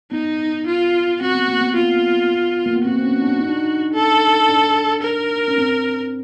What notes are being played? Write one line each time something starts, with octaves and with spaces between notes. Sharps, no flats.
B3 D#4
F4
C4 F#4
B3
A#3
B3
F4
A#3
B3
C4 F#4
C4
C#4
D4
D#4
D4
D#4
A4
D4
A#4
C#4
C4